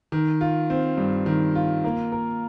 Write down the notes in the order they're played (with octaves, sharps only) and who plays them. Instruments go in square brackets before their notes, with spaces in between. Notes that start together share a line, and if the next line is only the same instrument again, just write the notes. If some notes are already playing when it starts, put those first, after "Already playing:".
[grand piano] D#3
F4
C4
G2
D#3
F4
A#3
A#4